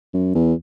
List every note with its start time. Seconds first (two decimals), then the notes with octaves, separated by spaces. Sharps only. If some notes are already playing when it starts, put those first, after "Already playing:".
0.14 F#2
0.35 E2